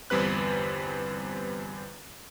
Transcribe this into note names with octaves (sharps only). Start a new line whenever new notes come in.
G1 E2 G3 C4 B4 F#6